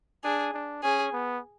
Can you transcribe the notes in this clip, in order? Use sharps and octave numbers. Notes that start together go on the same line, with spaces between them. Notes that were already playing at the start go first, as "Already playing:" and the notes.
D4 G#4
D4
C#4 G#4
B3